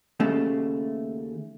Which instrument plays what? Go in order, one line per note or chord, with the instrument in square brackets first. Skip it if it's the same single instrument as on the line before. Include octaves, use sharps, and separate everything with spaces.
[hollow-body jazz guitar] D#2 C#3 A3